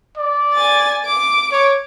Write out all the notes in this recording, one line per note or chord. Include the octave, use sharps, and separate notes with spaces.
D5
G#5 A6
D6
C#5